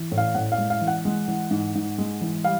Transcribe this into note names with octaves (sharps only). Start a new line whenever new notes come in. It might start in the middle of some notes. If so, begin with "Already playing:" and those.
Already playing: E3
A2
F5
A2 F#5
F5
G#3
F5
E3
F#5
G#3
E3
G#2
G#2
G#3
E3
G3 F5